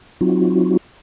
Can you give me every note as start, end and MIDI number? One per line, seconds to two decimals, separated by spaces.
0.21 0.77 54
0.21 0.77 60
0.21 0.77 63
0.21 0.77 65
0.21 0.77 66